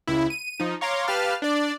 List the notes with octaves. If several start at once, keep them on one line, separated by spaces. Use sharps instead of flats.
C#2 E4
D#7
F3 D#4
C#5 F5 A#5 C6 D6
G4 B4 F5 A5 F6
D4 D5